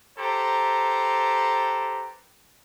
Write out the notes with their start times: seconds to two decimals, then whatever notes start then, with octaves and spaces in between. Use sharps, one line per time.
0.18 G4 A4 B4 C5 A#5